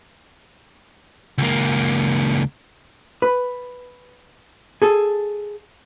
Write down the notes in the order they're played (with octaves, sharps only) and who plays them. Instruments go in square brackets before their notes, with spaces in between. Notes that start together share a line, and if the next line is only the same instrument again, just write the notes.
[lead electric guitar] C#2 A#3
[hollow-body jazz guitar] B4
G#4 A4